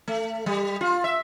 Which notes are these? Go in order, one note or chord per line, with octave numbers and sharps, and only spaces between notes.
A3
G3
F4
E5